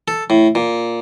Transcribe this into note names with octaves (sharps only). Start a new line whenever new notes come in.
A4
A2
A#2